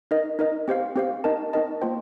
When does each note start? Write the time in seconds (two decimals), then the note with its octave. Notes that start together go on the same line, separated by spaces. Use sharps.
0.11 D#4 A#4 D#5
0.39 D#4 A#4 D#5
0.68 C4 G4 C5 F5
0.96 C4 G4 C5 F5
1.24 C4 D#4 A#4 D#5 A5
1.53 C4 D#4 A#4 D#5 A5
1.81 A#3 F4 C5 G5